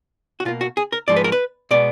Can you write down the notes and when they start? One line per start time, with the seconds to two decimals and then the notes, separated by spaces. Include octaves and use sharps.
0.40 F#4
0.45 B2 A#3 F4
0.61 F#4
0.77 G#4
0.92 A#4
1.08 G#2 F3 G#3 D5
1.16 B4
1.24 A#4
1.32 B4
1.71 B2 G#3 B3 D5